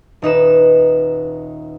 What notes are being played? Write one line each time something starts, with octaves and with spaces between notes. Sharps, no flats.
D#1 D#4 B4 E7